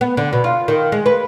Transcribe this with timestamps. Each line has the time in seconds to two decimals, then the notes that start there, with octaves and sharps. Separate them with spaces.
0.01 B3
0.17 D3
0.33 B2
0.44 F4
0.68 D#3
0.92 G#3
1.06 B4